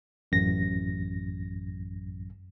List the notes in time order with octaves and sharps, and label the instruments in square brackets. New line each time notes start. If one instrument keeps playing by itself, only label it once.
[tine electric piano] A1 F#2 A#6